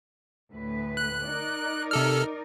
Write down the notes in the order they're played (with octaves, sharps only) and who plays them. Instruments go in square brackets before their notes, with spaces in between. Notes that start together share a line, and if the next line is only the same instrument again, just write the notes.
[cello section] D2 A2 B4
[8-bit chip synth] F#6
[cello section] D#4 A#4 D5
[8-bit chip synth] C3 A4 F6